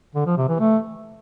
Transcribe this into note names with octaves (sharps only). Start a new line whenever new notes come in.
D3
F3
C3
E3
A3